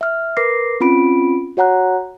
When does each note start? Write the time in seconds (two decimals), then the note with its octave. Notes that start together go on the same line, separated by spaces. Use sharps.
0.01 E5 F6
0.37 A#4 B4 D6 A#6 C7
0.81 C4 C#4 F4 B5 D7
1.57 F#4 C#5 F#5 A#5 F#6